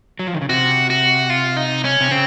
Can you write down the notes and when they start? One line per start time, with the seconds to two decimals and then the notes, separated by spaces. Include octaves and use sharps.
0.19 F#3
0.27 F3
0.34 D#3
0.41 C#3
0.49 C3 F#4
0.90 F#4
1.30 F4
1.57 D#4
1.84 C#4
2.01 C3
2.11 C#3 C4